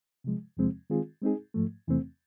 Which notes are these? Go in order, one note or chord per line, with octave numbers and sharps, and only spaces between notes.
C3 F3 G#3
E2 C3 F3 G#3 C4
D#3 G#3 C4 F4 G#4
G#3 C4 D#4 G#4
G#2 F3 A3
E2 C3 E3 A3 C4